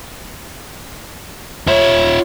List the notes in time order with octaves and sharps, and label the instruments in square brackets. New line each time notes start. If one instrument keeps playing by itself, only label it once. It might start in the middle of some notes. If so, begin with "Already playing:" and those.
[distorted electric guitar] F4 E5 [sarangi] C#5